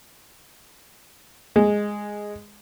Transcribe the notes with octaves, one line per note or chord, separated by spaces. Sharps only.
G#3